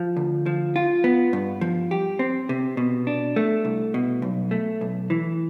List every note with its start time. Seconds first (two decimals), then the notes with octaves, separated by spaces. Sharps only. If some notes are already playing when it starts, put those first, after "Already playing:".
Already playing: F3
0.17 D2
0.46 F3
0.76 F4
1.04 B3
1.33 G2
1.61 F3
1.91 G4
2.19 C4
2.49 C3
2.77 B2
3.07 D4
3.36 A3
3.65 C2
3.94 B2
4.22 B1
4.51 A3
4.81 B1
5.10 E3